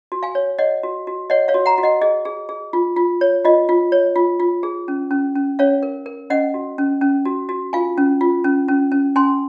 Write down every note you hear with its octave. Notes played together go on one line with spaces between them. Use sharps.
F#4
F5 G#5
C#5
C#5 D#5 F#5
F#4
F#4
C#5 D#5 F#5
C#5 F5
F#4
F#5 A#5
F#4
D#5 F#5
G#4 D#5
G#4
G#4
F4
F4
C#5
F4 D#5
F4
C#5
F4
F4
G#4
C#4
C#4
C#4
C#4 C#5 F5
A#4
A#4
C#4 D#5 F#5
F#4
C#4
C#4
F#4
F#4
F4 F5 G#5
C#4
F4
C#4
C#4
C#4
C#4 G#5 C6